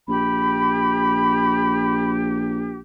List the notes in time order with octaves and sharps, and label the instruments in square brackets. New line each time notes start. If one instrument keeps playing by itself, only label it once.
[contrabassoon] A#1 [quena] G4 [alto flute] B5